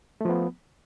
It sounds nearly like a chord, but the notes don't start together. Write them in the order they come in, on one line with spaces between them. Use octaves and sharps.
A3 F3 B3